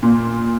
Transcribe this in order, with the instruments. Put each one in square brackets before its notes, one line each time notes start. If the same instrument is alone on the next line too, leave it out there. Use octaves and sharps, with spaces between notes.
[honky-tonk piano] A#2